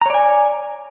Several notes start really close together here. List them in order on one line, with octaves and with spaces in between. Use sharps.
A#5 C#5 D5 G#5